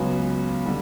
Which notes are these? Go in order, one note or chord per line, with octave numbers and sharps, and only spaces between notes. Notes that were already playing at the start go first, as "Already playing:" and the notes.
Already playing: C#2 C#3 F#3 B3
D3 G3